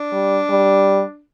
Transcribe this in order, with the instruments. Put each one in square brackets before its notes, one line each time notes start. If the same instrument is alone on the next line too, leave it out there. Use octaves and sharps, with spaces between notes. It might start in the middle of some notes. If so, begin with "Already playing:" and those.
Already playing: [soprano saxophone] D4
[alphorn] G3
G3